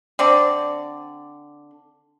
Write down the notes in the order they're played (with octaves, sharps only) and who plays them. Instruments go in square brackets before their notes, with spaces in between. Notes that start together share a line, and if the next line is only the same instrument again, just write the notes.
[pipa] D3 C4 D5